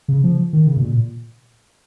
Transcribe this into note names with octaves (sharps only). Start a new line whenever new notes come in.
C#3
F3
D#3
C#3
B2
A#2